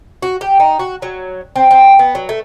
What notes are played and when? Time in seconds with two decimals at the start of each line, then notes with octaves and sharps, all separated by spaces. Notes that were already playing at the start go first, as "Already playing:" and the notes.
0.22 F#4
0.41 G4
0.60 D#4
0.79 F#4
1.02 F#3
1.56 C4
1.71 C4
1.99 B3
2.15 F#3
2.29 A3